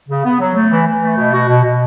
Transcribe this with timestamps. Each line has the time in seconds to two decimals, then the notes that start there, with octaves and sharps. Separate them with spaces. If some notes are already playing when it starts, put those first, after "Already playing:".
0.09 C#3
0.25 B3
0.40 F#3
0.56 A3
0.71 E3
0.87 E3
1.03 A3
1.17 B2
1.34 F#4
1.49 B2
1.64 B2